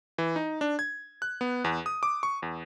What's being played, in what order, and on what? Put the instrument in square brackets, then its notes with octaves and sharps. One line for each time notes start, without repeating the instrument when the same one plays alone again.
[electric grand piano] E3
D#4
D4
G#6
F#6
B3
E2
D#6
D6
C#6
E2